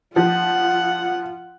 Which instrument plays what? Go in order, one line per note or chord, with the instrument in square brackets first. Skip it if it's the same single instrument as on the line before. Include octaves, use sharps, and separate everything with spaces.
[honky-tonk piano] F3 [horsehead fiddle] F4 [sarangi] F#5